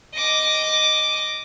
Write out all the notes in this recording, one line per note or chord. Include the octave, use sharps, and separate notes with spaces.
D#5 D6